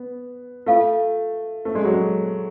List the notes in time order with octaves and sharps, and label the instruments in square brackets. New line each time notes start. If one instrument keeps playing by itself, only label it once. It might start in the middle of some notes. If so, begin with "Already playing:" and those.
Already playing: [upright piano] B3
[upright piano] A3 [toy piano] F4 A4 F5
[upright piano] A3
G#3
F#3
G#3